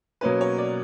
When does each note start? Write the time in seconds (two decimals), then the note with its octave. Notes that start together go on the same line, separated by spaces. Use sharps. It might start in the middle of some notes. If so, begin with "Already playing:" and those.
0.21 B2 F#3 A#3 C#4 B4
0.41 C#5
0.58 D5